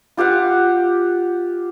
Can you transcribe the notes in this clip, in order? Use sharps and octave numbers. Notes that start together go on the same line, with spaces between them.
F4 G4 F5 F#5